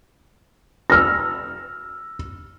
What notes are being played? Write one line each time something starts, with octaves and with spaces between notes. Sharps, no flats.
E6 F6 A#6